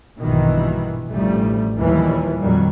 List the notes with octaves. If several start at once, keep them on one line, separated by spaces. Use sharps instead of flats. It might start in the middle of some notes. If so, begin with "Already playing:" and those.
A#1 G2 B2 D#3 E3
A1 D2 A2 F3 G3 A3
D#2 A#2 E3 F3 G3
F2 A#2 D#3 F#3 G3